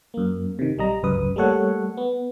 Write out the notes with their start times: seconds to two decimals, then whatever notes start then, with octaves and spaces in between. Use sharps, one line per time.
0.14 F#2 A#3
0.59 C3 D#3
0.78 B1 G3 D#5 A#5
1.03 G1 C#2 F#2 B4 D#6
1.36 G3 A3 A#3 A4 C#5 F#5
1.97 B3